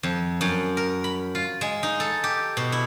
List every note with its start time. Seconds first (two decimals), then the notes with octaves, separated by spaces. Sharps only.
0.03 F2
0.41 F#2
0.77 A#4
1.04 B5
1.35 F4
1.61 G#3
1.83 D#4
2.00 A4
2.24 G4
2.57 B2
2.72 E4